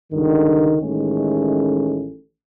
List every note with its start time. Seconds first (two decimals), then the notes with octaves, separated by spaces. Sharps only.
0.13 C#2 G2 D3 D#3
0.82 A1 D#3 G#3 A3 C#4